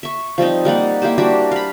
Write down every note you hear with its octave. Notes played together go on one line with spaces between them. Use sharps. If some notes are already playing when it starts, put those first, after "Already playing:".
E5 C#6
F3 G3 C4 D#4
G3 A#3 D#4 F#5
A#3 E4 G4 C5
G3 D4 F#4 G4
F5 B5